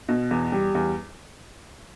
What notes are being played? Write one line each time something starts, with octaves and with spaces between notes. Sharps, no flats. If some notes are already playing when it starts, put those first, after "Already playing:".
B2
E2
G3
E2